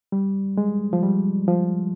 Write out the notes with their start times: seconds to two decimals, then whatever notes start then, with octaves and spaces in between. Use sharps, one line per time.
0.12 G3
0.57 G#3
0.93 F3
1.03 G3
1.48 F3